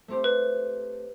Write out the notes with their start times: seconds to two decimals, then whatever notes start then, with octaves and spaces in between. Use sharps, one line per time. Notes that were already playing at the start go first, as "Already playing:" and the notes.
0.08 A3 C4 G4 C5
0.24 B4